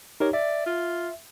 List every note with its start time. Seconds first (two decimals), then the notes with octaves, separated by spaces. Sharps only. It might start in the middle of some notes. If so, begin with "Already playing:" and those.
0.20 D#4 G4 A#4 C#5
0.33 D5 E5
0.66 F4